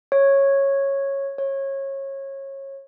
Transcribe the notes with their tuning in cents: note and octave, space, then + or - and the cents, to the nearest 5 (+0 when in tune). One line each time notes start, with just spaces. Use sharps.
C#5 -10
C#5 -25